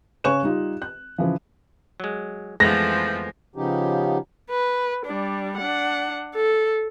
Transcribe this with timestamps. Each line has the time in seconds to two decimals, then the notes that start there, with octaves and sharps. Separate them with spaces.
0.24 C#3 C#5 G#5 C#6 F#6 E7
0.43 G3 D#4 F4
0.82 F#6
1.18 C#3 E3 F3
2.00 F#3 G#3
2.60 F2 E3 F3 G#3 A3 B3 A#6
3.56 C#3 F3 B3 C#4 D#4 G4
4.50 B4
5.06 G3 D4
5.57 D4 F#5
6.35 A4